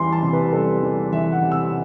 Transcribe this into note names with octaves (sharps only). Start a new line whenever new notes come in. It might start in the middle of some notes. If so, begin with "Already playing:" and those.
Already playing: E2 E3 G3 C6
A5
C3
B4
G3 A4
E2
E3 E5
F#5
C3
E6